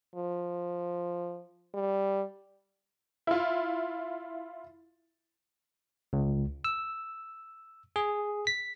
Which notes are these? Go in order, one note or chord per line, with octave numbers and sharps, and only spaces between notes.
F3
G3
E4 F4
C#2
E6
G#4
B6